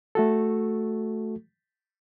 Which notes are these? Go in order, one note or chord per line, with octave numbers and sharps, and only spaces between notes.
A3 F#4 A4